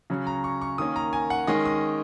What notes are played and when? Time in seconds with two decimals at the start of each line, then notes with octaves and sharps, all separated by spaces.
0.10 C#3 F#3 C#4
0.27 A#5
0.44 C#6
0.61 C#6
0.78 D#3 A#3 C#4 D#6
0.96 A#5
1.13 G#5
1.30 F#5
1.47 D#3 G#3 C#4 D#5
1.65 D#6